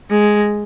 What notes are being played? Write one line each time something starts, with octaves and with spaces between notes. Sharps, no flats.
G#3